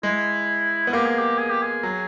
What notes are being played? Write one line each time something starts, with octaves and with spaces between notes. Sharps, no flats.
G#3 E4
B3
A#3 G4
G#4
G4
G#4
G4
G#4
F#3